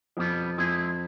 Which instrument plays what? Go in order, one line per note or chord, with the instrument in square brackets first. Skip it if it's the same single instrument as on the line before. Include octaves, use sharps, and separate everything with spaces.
[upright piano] F2 [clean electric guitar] B2 G3 B3
[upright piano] F2 [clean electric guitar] G#3 C4 E4 G#4